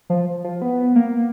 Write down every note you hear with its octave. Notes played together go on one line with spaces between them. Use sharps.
F3
F3
B3
A#3